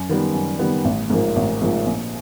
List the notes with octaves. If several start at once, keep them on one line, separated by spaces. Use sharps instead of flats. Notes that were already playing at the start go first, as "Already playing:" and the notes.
Already playing: F#2
D#3 G3 B3
F#2
D#3 G3 B3
A1
G#2 F3 A#3
A1
G#2 F3 A#3
A#1